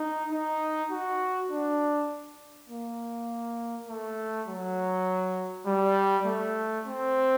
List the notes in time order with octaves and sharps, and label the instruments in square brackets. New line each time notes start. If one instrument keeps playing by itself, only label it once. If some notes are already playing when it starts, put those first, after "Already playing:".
Already playing: [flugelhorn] D#4
D#4
F#4
D4
A#3
A3
F#3
G3
A3
C4